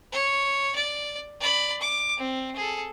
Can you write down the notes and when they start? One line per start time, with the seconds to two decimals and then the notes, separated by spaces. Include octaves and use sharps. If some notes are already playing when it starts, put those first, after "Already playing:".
0.12 C#5
0.76 D5
1.41 D5 B5
1.81 D6
2.18 C4
2.56 G#4 A4